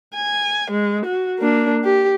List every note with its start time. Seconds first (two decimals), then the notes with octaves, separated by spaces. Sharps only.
0.15 G#5
0.71 G#3
1.06 F#4
1.40 A#3 D4
1.84 G4